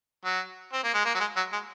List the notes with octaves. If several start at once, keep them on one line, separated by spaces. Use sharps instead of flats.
F#3
C4
A#3
G#3
A#3
F#3
G#3
F#3
G#3